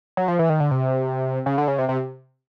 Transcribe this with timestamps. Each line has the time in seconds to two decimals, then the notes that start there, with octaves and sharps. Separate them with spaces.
0.17 F#3
0.28 F3
0.39 E3
0.49 D#3
0.60 D3
0.71 C3
1.46 C#3
1.58 D3
1.68 C#3
1.78 C3
1.89 C3